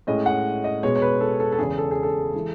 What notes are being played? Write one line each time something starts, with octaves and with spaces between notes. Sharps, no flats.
A2 G#3 C#4 D#5
F#5
D#5
B2 G#3 B3 C#5
C#5
B4
A4
A4
A4
E2 C#3 G#3 B3 G#4
A4
G#4
A4
E3 G#3